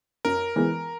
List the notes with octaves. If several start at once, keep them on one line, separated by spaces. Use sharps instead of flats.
F#2 A#4
E3 G#3 B3